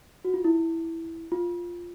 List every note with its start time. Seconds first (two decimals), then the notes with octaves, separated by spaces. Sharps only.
0.25 F#4
0.34 F4
0.44 E4
1.32 F4